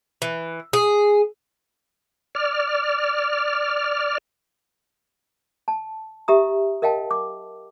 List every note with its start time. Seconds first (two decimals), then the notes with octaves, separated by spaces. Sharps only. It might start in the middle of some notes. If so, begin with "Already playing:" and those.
0.22 E3
0.73 G#4
2.35 D5 F6
5.68 A5
6.28 G4 E5 A#5 D#6
6.82 A#4 D#5 F5 G5 A5
7.11 D6